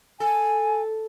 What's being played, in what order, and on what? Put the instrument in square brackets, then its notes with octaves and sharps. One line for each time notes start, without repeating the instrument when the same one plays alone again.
[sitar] A4 [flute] G#5